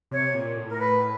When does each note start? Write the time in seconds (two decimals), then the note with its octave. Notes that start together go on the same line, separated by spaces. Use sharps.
0.11 C3 C#5
0.34 A#2
0.57 A2
0.69 A#4
0.79 B4